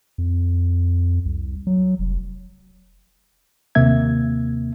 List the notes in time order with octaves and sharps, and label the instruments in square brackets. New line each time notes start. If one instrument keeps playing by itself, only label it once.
[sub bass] F2
C2
F#3
F1
[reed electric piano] D#2 C3 A#3 E5 G#6